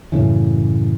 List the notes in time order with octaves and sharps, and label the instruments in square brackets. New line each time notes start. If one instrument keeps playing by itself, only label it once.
[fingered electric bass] F#2 A2 C#3 E3